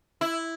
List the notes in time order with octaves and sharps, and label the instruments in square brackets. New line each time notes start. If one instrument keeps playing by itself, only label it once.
[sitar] E4